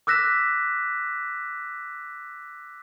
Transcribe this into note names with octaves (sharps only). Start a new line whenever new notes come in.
D6 E6 F#6 A#6 B6 E7